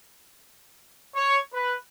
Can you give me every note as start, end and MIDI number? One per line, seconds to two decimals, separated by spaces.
1.15 1.38 73
1.54 1.76 71